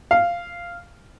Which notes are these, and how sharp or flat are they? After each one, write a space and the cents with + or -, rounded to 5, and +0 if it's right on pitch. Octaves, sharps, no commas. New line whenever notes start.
F5 -10